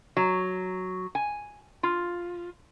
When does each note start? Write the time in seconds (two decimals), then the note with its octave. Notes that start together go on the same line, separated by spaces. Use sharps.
0.17 F#3
1.15 G#5
1.83 F4